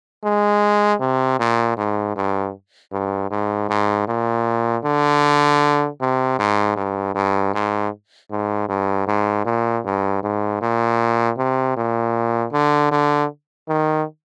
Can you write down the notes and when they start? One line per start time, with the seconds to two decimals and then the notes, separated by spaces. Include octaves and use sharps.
0.24 G#3
1.00 C3
1.39 A#2
1.78 G#2
2.17 G2
2.92 G2
3.31 G#2
3.69 G#2
4.08 A#2
4.84 D3
6.01 C3
6.39 G#2
6.76 G2
7.15 G2
7.54 G#2
8.31 G#2
8.69 G2
9.07 G#2
9.45 A#2
9.85 G2
10.23 G#2
10.62 A#2
11.38 C3
11.77 A#2
12.53 D3
12.91 D3
13.69 D#3